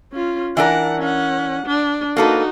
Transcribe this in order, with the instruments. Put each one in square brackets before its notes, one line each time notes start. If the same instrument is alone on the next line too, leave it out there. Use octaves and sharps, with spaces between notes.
[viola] C#4 F4
[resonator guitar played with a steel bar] E3 D4 A#4 [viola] F#5
[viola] C#4 F#5
D4
[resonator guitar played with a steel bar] A#3 A4 B4 [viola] D#4 F#4